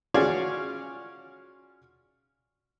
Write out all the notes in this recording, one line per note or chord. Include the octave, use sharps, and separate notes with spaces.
C#4 F4 F#4 G#4 C#5 D5